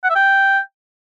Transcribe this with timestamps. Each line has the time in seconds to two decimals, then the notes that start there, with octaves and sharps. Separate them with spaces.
0.04 F#5
0.10 E5
0.16 G5